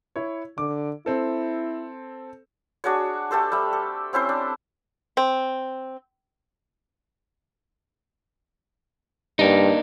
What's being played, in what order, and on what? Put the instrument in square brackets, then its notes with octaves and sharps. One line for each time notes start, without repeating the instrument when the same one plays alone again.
[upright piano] E4 C#5
[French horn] D3 [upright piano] D6
[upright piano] C4 A4 [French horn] E4
[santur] D4 F#4 G#4 C#5
A3 G4 A4 C5
G3 E5
A4
C4 C#4 E4 C5
D4
[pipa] C4
[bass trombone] G2 [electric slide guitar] A#3 D4 D#4